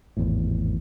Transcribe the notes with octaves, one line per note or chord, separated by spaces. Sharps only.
G#1 E2 A2